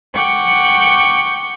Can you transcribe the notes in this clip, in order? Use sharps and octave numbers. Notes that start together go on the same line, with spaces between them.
F#5 G5 C#6 D6